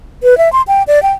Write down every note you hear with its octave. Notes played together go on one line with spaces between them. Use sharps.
B4
E5
C6
G5
D5
G5